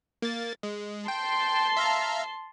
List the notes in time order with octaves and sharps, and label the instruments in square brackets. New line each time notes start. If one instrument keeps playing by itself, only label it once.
[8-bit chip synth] A#3 A6
G#3
[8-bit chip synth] G5 [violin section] A5 C6
[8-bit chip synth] E5 F5 A#5